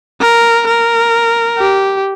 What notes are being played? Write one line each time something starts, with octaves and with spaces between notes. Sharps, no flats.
A#4
A#4
G4